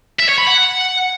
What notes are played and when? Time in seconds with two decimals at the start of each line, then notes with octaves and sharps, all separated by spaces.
0.20 E5
0.29 C#5
0.38 B5
0.47 F#5